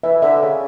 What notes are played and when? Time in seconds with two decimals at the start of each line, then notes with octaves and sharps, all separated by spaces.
0.03 E3 E5
0.22 D3 E5
0.42 C#3 E5